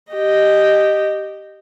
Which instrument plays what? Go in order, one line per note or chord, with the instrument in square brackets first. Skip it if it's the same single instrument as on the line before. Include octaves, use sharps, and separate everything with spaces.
[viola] G4 D#5